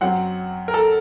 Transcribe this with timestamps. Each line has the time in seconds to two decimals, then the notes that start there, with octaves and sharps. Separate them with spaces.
0.01 F#2 F#3 C4 F#5
0.68 A#4
0.74 A4